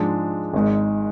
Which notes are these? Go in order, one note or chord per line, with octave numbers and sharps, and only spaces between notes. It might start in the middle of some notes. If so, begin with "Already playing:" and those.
Already playing: G#2 F3 G#3 D4
G#1 G#2 G#3